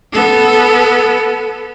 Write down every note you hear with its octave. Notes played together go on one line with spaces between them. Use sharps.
B3 A4